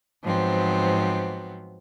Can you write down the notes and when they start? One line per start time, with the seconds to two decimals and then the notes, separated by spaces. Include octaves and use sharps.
0.23 G#2 F3 F#3 B3 C4